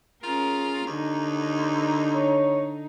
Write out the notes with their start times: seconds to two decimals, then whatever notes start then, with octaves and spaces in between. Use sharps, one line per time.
0.23 C#4 F4 G#4 A#4
0.87 D#2 D3 D#4
2.13 C#5